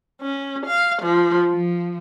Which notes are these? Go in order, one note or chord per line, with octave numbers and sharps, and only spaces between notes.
C#4
F5
F3
F3